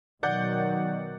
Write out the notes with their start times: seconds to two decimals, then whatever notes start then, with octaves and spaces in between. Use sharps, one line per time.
0.23 B2 D#3 F#3 D5 F#5 G6